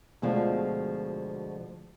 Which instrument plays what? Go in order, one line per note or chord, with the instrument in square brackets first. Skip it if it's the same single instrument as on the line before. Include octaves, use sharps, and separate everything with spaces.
[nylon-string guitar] D2 B2 F3 G#3 F4